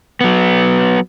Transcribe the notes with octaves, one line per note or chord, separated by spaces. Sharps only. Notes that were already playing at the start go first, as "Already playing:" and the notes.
F#3 B3